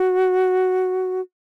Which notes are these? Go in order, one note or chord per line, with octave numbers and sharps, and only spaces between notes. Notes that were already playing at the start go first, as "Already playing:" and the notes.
Already playing: F#4